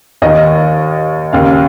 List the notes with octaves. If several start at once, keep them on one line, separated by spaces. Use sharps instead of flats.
D#2 D#3 D#5
D#2 C#3 F5